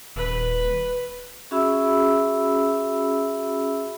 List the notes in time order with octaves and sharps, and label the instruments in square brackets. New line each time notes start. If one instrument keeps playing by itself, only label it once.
[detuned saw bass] D#1 [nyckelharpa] B4
[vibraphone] C#4 F#4 G#4 E5 B5 E6